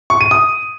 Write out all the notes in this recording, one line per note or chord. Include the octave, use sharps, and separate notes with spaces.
C#6
D#7
D#6